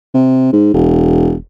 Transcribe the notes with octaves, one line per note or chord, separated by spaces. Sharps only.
C3
G#2
E1